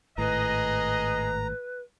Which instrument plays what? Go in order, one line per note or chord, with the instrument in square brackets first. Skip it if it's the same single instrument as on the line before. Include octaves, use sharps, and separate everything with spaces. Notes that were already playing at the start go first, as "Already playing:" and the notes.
[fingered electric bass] G#1 A2 [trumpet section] G#4 D#5 [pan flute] B4 [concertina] A#5